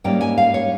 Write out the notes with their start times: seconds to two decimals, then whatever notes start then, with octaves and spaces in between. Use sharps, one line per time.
0.04 G#2 G3 A#3 C#4 G5
0.21 G#5
0.38 F5
0.54 C#5